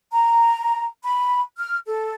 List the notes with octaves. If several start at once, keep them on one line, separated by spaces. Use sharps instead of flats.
A#5
B5
F6
A4